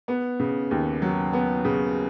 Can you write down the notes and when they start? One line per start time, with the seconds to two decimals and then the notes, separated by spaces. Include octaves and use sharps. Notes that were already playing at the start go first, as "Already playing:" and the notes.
0.08 B3
0.40 C#3
0.71 D#2
1.02 F#3
1.33 B3
1.65 C#3